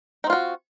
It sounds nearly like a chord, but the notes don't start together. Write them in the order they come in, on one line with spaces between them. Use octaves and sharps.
D#4 C4 F4 F#4